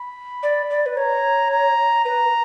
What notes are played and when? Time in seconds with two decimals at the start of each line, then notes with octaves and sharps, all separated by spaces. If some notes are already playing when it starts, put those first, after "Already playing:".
Already playing: B5
0.43 D5
0.70 D5
0.86 B4
0.97 C#5 A#5
1.51 A#5
2.04 B4 A#5